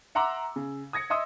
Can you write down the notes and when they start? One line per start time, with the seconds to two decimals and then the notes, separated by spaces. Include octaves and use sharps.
0.15 E5 F#5 A#5 C6 D6 E6
0.56 C#3
0.93 D#6 G#6 A#6 C#7
1.10 D#5 E5 C6 D#6 E6